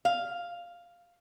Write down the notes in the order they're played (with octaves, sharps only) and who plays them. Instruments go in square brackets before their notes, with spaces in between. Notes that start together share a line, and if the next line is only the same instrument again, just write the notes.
[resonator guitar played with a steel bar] F5